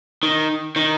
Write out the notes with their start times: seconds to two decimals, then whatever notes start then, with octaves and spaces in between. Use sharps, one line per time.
0.23 D#3
0.76 D#3